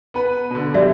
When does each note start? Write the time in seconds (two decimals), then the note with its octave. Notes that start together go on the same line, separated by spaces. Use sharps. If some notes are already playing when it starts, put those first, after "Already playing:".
0.14 B3 B4
0.51 B2 D3
0.74 G3 F#4 D5 E5